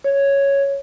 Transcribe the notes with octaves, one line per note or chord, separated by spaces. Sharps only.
C#5